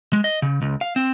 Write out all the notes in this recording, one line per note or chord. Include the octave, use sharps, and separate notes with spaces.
G#3
D#5
C#3
C#2
F5
C4